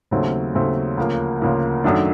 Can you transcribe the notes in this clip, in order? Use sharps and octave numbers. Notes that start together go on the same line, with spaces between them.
D#2 C#3 F#3 A3 C4
D#2 C#3 F#3 A3 C4
D2 C#3 F3 A#3
D2 C#3 F3 A#3
F#2 D#3 F#3 A3 D4